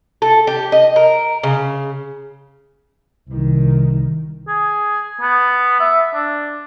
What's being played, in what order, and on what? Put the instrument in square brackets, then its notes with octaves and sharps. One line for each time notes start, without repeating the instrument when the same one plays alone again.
[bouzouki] A4
G4
D#5
A#4
C#3
[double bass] C2 D#3
[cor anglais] G#4
B3
E5
D4